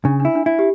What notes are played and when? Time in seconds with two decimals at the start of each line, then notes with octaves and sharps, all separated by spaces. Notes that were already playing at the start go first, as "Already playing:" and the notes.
0.05 C#3 D4
0.20 D4
0.25 E4
0.35 D4
0.46 E4
0.59 G4